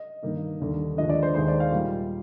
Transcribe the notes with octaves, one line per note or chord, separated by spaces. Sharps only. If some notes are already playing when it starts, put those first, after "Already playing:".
Already playing: D#5
G2 D#3 A#3 D#4
D#2 D3 G3 D4
D#2 D3 F3 G#3 D4 D#5
D5
C5
D#2 D#3 G#3 D#4 C5
D5
F5
A#2 G3 A#3 D#4